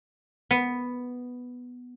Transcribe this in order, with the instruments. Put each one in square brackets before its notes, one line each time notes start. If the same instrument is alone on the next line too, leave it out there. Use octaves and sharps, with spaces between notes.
[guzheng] B3